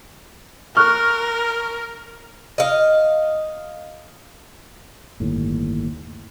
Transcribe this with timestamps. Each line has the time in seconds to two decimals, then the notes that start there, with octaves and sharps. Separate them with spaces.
0.77 A#4 C#6 F6 F#6
2.58 D#5 F5
5.20 G1 D#2 A2